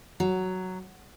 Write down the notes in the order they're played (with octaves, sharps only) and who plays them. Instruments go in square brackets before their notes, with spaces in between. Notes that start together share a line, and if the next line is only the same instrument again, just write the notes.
[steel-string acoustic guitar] F#3